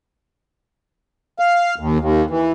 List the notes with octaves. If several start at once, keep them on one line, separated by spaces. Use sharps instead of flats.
F5
D#2
D#2
E3